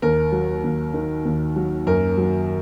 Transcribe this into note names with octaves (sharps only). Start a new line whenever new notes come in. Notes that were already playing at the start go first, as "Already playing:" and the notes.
D#2 A#4
F#3
D#2
D#3
D#2
F#3
F#2 A#4
F#3